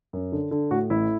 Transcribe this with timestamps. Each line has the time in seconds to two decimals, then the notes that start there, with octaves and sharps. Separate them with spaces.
0.13 F#2
0.32 D3
0.51 D3
0.71 A2 F#4
0.90 A1 E4